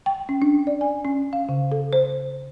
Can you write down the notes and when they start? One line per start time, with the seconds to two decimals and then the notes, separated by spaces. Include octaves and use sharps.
0.06 G5
0.29 C#4
0.42 D4
0.67 D5
0.81 G#5
1.05 C#4
1.33 F5
1.49 C#3
1.72 A4
1.93 C5